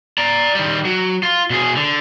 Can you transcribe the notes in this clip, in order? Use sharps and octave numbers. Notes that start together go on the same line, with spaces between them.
D5 A#5
D#3 G3
F#3
F4
B2 G#4
D3